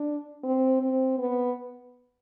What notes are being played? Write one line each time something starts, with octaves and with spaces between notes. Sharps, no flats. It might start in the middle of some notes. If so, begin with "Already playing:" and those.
Already playing: D4
C4
C4
B3